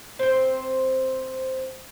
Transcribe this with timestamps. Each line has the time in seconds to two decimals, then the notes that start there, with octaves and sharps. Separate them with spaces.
0.19 C4 C5